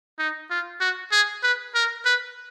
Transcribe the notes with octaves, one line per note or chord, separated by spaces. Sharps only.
D#4
F4
F#4
G#4
B4
A#4
B4